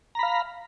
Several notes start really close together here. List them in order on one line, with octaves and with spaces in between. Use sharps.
A#5 B5 F5